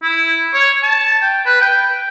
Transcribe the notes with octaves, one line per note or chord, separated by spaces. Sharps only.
E4
C#5
A5
G5
B4
G5